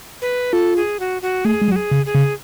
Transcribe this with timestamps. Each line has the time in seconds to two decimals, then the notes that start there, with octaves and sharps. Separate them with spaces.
0.22 B4
0.53 F4 A4
0.76 G#4
1.00 F#4
1.22 F#4
1.45 A3 G#4
1.62 G#3
1.68 F#3
1.72 F#4
1.76 G#4
1.91 C#3
2.06 G#4
2.15 C#3